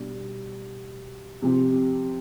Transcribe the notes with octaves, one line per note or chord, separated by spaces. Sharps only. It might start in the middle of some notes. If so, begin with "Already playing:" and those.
Already playing: B2 G3 D4
C3 F3 C4 G4